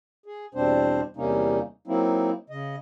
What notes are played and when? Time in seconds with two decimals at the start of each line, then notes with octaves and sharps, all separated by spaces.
0.26 G#4
0.55 E2 B2 G3 C4 D4 C5
1.17 E2 C3 G3 A#3 C#4 D#4
1.87 F#3 A#3 C4 D#4 E4
2.50 C#3 D#5